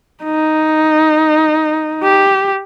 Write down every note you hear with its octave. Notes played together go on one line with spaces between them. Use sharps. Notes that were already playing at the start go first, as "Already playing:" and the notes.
D#4
G4